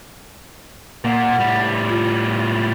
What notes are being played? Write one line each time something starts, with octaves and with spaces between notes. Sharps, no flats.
A#2 A#3 F#5
A2 G3
F4